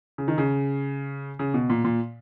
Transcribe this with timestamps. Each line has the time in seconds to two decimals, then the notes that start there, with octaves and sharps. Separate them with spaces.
0.18 C#3
0.28 D#3
0.38 C#3
1.39 C#3
1.54 B2
1.70 A#2
1.84 A#2